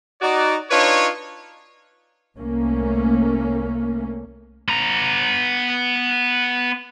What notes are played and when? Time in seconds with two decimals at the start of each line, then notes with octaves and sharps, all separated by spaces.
0.22 D#4 F#4 D5
0.71 D4 D#4 F4 B4 C#5
2.37 C2 A3 A#3 C#4
4.69 B3 A#5